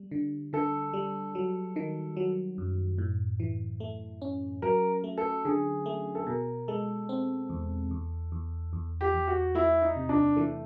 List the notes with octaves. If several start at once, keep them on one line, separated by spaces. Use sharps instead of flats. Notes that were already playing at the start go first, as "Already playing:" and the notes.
Already playing: G3
D3
D3 A4
G3
F#3
D#3
F#3
F#2
A2
E3
A3
C#4
F#3 A#4
A3
A4
D3 G#4
A3
A4
B2 A#4
G#3 A4
C4
E2
E2
E2
E2
G4
E2
F#4
A3 E4
D#4
C3
D4
E3 A3